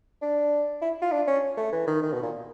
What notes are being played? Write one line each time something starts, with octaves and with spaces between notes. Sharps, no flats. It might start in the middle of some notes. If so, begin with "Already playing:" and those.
D4
E4
F4
D4
C#4
A3
E3
D#3
D#3
B2
A#2